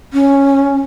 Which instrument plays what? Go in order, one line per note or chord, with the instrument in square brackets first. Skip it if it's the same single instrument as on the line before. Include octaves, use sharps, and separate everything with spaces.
[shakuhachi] C#4